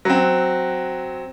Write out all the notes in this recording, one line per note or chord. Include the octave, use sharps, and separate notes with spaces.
F#3 C4